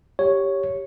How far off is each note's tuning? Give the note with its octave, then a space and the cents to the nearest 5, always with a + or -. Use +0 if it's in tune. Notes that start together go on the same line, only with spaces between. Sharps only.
G4 +0 C#5 +0